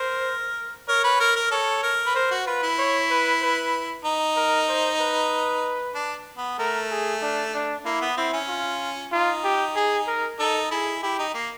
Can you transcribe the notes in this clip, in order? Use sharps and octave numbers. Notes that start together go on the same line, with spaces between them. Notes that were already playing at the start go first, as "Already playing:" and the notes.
Already playing: A#4 C5
A#4 C#5
B4
A#4
A#4
A4 C#5
A#4
B4
A#4 C5
F#4
F4 B4
E4
C#5
B4
B4
D#4
A#4
C5
B4
D4
B3
A3 A#4
G#4
D4
D4
A#3 E4
B3
C4 E4
C#4
F4
D#4 F4
G4
G#4
A#4
D#4 A4
E4 G#4
E4 G4
D#4
A#3